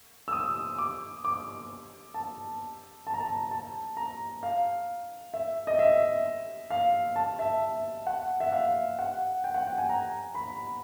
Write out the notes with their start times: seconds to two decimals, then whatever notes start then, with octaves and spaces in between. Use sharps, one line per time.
0.28 E6
0.32 D#6
0.78 D6
1.25 D6
2.14 A5
3.07 A5
3.14 A#5
3.20 A5
3.51 A5
3.97 A#5
4.43 F5
5.34 E5
5.67 D#5
5.79 E5
6.70 F5
7.16 A5
7.39 E5
8.07 F#5
8.40 E5
8.52 F5
8.99 F#5
9.44 G5
9.54 F#5
9.67 G5
9.78 G#5
9.89 A#5
10.35 B5